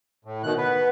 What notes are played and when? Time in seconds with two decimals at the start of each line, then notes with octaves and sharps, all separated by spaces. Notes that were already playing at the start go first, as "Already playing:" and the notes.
0.25 A2
0.44 B2 D#3 F#6
0.58 B3 B4